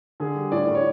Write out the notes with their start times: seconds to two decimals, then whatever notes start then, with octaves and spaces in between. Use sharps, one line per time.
0.20 D3 G#4
0.35 G3
0.52 A2 D5
0.68 A2
0.75 C#5